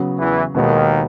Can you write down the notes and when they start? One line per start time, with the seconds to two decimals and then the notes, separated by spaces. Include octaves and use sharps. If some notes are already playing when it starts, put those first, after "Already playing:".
Already playing: C#3 F#3 B3
0.19 E2 E3
0.54 D#2 B2 D#3 G#3 B3